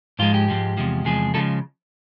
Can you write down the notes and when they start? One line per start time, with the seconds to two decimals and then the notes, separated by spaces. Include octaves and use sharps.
0.19 G#2 F3 G#3 F4
0.34 G4
0.48 G#2 F3 G#3
0.77 E2 C3 F3 G#3
1.05 E2 C3 F3 G#3 G#4
1.34 C#3 F3 G#3 A4